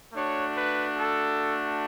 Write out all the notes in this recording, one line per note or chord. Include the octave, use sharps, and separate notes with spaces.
A3 D4 F#4 C#5
B4
A4